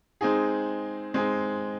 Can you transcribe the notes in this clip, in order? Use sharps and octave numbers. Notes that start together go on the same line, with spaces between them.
G#3 C4 D#4 G#4
G#3 C4 D#4 G#4